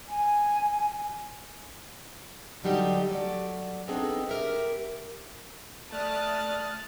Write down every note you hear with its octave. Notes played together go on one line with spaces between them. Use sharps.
G#5
D3 D#3 F#3 G3 D#4 G4
F#3 A3 D5
B3 C4 D4 D#4 G#4 A4
G4 A#4 E5
A3 D5 A5 D#6 F6 F#6 A6